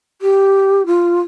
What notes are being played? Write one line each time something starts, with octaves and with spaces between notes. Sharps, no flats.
G4
F4